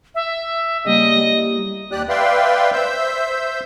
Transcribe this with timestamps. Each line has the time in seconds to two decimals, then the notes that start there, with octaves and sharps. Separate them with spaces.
0.15 E5
0.85 C#3 G3 A#3 D#5
1.18 G3 E4
1.92 D#2 G4 D5 F#6
2.09 B4 D5 E5 F5 G5 C6
2.73 C5 E5 E6 G6